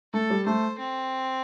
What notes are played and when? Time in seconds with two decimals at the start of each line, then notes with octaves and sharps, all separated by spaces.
0.13 A3 A4
0.30 G3
0.46 A3 C5
0.79 C4